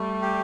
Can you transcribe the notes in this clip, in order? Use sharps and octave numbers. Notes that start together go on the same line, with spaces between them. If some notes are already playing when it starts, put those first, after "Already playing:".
Already playing: G3 A3
G4